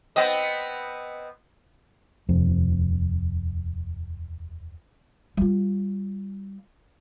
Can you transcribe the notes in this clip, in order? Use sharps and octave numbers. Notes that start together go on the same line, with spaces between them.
B3 C4 D#5
D#1 F2 C3 F3
G3 F4